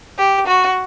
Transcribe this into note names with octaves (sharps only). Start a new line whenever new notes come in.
G4
F#4